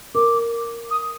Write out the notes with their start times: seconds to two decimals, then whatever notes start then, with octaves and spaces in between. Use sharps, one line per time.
0.15 A#4 D6
0.90 D#6